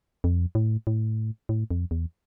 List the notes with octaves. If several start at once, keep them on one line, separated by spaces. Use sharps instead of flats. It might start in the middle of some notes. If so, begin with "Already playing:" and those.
F2
A2
A2
A2
F2
E2